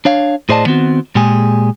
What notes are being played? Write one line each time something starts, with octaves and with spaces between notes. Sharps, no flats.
D4 C#5 F5
A2 G#4 C5 D5 D#5 A5
D#3 B3 C4 F#4
A#2 G#3 G4 G#4